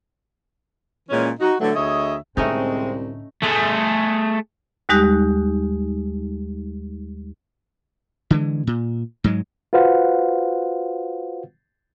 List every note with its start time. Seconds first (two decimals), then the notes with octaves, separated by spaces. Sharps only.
1.10 A#2 E3 G#3 C#4
1.40 D#4 F#4
1.60 D3 E3 F#3 A3
1.75 D2 G#4 C#5 D#5 E5
2.37 C2 A2 D3 G#3 A3 C4 C#4 D#4
3.42 A3 G#4
4.89 D#2 G3 G#3 D#4 G4 F#6
8.30 D3 E3 G#3
8.67 A#2
9.24 G#2 F#3 G#3
9.73 F4 F#4 B4 C5 F5 F#5